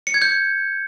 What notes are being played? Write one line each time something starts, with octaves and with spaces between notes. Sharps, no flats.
C#7
G#6
G6